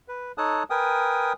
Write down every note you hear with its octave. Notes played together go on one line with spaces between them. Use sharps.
B4
D#4 A4 C#5 A5 D#6 F#6
A#4 B4 G5 G#5 D#6